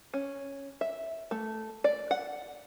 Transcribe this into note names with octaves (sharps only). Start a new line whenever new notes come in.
C#4
E5
A3
D5
F#5